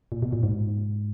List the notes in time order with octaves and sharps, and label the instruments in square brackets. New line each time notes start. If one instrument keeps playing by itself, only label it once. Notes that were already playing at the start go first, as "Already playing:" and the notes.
[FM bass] A#2
B2
A#2
G#2